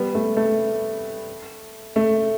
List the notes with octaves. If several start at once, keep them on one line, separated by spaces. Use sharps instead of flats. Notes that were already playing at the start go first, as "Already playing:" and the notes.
Already playing: G3 B3
A3
A3
A3